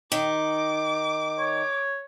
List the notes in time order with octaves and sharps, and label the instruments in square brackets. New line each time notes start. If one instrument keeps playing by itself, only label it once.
[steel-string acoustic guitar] D#3 [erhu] D6
[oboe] C#5